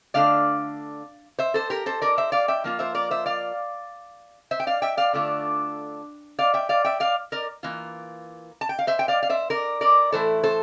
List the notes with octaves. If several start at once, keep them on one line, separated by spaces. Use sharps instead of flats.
D3 A3 D4 F4 D5 F5
C5 E5
A4 C5
G4 A#4
A4 C5
A#4 D5
C5 E5
D5 F5
E5 G5
F3 A#3 F4
C5 E5
A#4 D5
C5 E5
D5 F5
C5 E5
G5
D5 F5
E5 G5
D5 F5
D3 A3 D4 F4
D5 F5
E5 G5
D5 F5
E5 G5
D5 F5
A#4 D5
E3 A#3 F4
A5
G5
F5
C5 E5
G5
D5 F5
F5
C5 E5
A#4 D5
A#4 D5
A2 E3 A3 E4 A4 C5
A4 C5